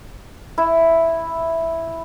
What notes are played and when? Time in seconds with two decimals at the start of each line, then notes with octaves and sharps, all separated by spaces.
0.58 E4